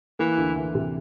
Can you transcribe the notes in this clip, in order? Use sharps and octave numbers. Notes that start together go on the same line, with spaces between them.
E3 A#3
D2
E3
C3